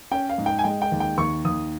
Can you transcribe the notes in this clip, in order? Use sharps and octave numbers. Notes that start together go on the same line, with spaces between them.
C#4 G5
F5
G#2
G5
G#5
G#3 G5
G5
D#2
G5
D#2 C#6
D#2 D#6